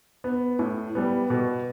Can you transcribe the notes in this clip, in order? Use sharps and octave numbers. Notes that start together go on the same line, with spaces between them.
B3
A2
G3 B3
B2